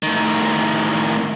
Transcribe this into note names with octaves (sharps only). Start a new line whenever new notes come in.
A2 D#3